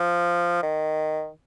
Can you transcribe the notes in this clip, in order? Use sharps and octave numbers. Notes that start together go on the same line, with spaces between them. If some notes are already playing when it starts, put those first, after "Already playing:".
Already playing: F3
D#3